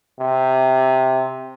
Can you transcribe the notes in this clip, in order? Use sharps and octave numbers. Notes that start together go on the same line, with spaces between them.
C3